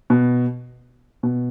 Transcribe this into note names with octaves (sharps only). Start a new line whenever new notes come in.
B2
B2